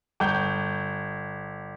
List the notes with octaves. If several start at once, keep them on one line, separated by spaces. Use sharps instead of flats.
G1 G6